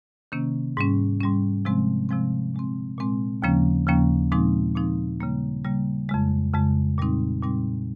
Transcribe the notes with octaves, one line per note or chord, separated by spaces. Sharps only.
C3 D#3 A#3 C#4
G#2 G3 C#4
G#2 G3 C#4
C3 F3 G#3 C4
C3 F3 G#3 C4
A#2 G#3 C4
A#2 G#3 C4
D#2 C#3 F3 A#3 C#4
D#2 C#3 F3 A#3 C#4
A#2 F3 G#3 C4 D#4
A#2 F3 G#3 C4 D#4
C#3 G3 A#3
C#3 G3 A#3
F2 C#3 G#3
F2 C#3 G#3
A#2 G3 C4 D#4
A#2 G3 C4 D#4